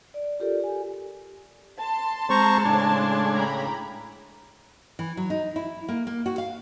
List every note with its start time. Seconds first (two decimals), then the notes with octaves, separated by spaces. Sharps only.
0.14 D5
0.40 F4 G4 A4 A#4 D5
0.60 G4 G#5
1.79 A5 C6
2.30 G#3 C4 C5 A#5 C#6
2.65 A2 C#3 G#3 D4 G#5
3.34 G5 A#5 B5
4.99 E3
5.17 F#3
5.30 D#4
5.56 E4
5.89 A#3
6.07 A#3
6.26 F#4
6.38 F5